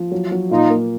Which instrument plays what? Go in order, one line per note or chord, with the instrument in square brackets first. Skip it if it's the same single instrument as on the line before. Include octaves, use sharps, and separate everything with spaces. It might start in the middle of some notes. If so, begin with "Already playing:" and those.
Already playing: [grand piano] F3
F#3
F#3
[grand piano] A#2 [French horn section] D#4 F4
[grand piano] A#3